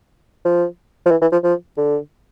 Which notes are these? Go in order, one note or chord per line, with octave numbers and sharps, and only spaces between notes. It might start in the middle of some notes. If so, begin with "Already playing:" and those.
F3
F3
E3
E3
F3
F3
D3